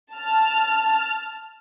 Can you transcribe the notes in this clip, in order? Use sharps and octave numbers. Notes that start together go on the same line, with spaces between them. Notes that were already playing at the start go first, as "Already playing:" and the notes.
A5 F6